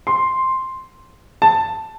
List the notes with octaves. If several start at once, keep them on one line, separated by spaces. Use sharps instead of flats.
C6
A5